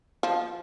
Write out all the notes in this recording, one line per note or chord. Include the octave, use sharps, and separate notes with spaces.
F3